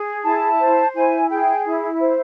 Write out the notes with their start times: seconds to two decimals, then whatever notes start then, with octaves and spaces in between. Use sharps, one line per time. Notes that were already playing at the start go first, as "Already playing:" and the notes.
Already playing: G#4
0.23 E4 A5
0.59 C5
0.94 E4 G#5
1.29 G#4 G5
1.65 E4
2.01 C5